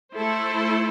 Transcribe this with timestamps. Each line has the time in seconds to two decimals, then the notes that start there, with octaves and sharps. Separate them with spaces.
0.15 A3 E4 A4 C5